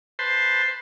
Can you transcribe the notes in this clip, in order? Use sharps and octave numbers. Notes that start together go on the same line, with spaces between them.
B4 C5 A5 C6